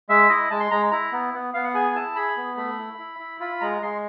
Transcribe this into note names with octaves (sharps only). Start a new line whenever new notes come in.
G#3 E5
E4 D#5
G#3 A5
C6
G#3 A#5
E4 A#5
B3
B3
B3 F5
F#5
G#4 G#5
E4 A5
G#4 B5
B3
A3 B5
E4
E4
E4
F4 B5
G#3 A#5
G#3 C6